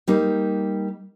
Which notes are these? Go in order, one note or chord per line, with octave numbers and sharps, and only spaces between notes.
G3 A#3 D#4